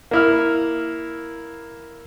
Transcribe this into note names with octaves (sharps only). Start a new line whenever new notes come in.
A#3 E4 F6